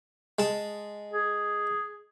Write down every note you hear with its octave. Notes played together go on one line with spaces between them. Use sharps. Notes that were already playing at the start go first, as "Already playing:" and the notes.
G#3 A5
G#4